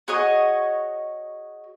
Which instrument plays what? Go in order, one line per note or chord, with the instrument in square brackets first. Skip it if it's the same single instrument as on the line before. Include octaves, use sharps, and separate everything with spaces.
[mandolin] F#4 G#4 C#5 D#5